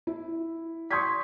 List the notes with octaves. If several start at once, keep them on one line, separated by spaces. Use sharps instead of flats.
E4
C6 C#6 D#6 G6 G#6 B6